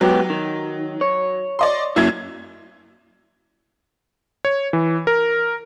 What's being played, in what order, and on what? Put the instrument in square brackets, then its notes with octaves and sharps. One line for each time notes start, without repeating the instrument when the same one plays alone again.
[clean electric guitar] G#2 B3 G4 [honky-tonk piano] F#3
[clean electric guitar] D#3
C#5
[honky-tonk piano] D5 D#5 C6
[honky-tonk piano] F#2 E5 G#6 [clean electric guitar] A#3 E4
[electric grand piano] C#5
E3
A#4